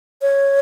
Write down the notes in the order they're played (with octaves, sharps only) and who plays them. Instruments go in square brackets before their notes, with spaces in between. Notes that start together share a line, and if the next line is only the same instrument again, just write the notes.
[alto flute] C#5